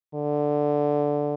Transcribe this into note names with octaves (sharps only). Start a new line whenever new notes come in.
D3